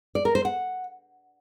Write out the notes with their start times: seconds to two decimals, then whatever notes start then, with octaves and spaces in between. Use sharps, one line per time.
0.15 D5
0.25 A#4
0.35 C5
0.45 F#5